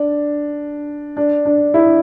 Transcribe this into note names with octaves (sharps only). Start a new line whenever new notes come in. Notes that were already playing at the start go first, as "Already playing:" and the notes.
Already playing: D4
D4
D4
E4